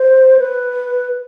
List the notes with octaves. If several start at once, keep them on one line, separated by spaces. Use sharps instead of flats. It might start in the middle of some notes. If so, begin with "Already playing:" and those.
Already playing: C5
B4